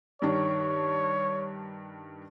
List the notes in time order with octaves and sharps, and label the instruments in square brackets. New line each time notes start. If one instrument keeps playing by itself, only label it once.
[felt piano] G2 D#3 D4 [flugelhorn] C#5